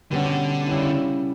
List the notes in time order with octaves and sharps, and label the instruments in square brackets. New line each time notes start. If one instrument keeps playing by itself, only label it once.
[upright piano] B2 G3 C#4 F#4 [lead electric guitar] D3
[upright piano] C#3 G3 C#4 E4